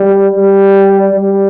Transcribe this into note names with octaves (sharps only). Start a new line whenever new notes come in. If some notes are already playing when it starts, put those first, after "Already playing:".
Already playing: G3
G3
G3